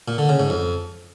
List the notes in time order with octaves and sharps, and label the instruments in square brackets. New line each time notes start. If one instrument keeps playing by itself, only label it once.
[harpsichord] A#2
D3
C#3
G#2
F2